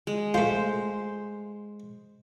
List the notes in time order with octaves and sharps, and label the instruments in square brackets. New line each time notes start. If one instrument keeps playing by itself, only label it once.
[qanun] G#3
[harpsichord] A3 F4 [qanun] C5